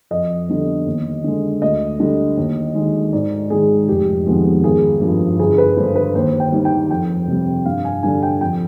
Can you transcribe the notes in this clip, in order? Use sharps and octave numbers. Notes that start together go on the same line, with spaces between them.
F2 D#5
D3 G3 B3
D#2
D3 G#3
D2 D#5
D3 G3
D#2
D#3 G#3
G#2 D5
D#3 G#3 G#4
F1 G4
F2 D#3 G#3 B3
G#1 G#4
G2 F3
G1 G#4
B4
G2 D3 C5
B4
D#2 C5
G5
D#3 G3
G5
F2 G5
C3 G3
G2 F5
G#5
D3 G3 D4 G#5
G5
F2 G5